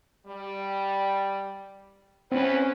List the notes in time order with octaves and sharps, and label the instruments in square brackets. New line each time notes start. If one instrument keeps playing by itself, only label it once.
[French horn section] G3
[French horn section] E2 B4 [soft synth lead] C4 [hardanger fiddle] C#4